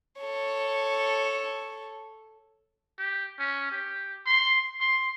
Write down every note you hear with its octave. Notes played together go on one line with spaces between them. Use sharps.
A4 C#5
G4
C#4
G4
C6
C6